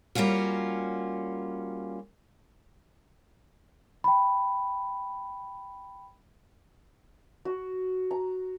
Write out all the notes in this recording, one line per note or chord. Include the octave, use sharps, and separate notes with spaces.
G3 A#3 C#4 F4 F#4
G5 B5
F#4
A#5